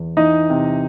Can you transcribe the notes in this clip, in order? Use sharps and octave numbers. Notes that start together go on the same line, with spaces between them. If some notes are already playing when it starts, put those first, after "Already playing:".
Already playing: E2
E3 D#4 D#5
C3